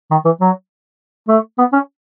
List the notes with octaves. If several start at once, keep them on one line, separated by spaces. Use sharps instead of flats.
D#3
E3
F#3
A3
B3
C#4